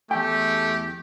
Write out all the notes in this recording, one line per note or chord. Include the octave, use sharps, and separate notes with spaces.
E2 A3 G4 G5